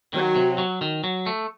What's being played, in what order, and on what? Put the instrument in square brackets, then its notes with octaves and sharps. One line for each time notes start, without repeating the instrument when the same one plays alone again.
[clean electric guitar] D#3 [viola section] F#3
[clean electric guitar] C3
F#3
D#3
F#3
A3